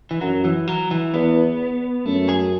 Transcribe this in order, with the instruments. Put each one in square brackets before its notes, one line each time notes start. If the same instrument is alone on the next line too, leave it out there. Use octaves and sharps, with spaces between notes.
[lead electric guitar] E3
[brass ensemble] F#2 [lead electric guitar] F#3
[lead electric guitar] E3
F#3
E3
[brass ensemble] E2 [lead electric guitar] B3
[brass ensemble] F#2 [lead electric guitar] A3
[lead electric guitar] G#4